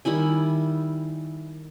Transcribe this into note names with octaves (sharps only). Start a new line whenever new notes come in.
D#3 G3 E4 G#5